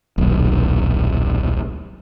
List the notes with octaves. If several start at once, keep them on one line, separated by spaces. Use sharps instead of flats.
D#1 B1